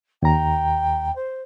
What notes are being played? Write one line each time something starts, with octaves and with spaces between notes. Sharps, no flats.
D#2 G5 A#5
C5